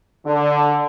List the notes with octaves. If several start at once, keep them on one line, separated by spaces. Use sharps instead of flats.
D3